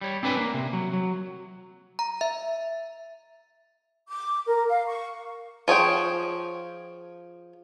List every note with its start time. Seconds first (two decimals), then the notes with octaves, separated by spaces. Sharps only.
0.01 G3 C#5
0.23 C4 D4 B4 G#5
0.37 A#3
0.54 C3
0.73 F#3
0.93 F#3
1.99 A#5
2.21 E5
4.07 D6
4.47 A#4
4.68 F5
4.87 C#6
5.68 F3 G#4 C#5 G5